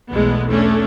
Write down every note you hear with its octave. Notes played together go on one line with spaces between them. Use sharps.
B1 E2 G#3 A3 B3
E2 A3 C#4 D4